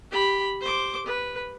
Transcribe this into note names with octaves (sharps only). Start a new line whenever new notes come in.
G4 B5
C5 D6
B4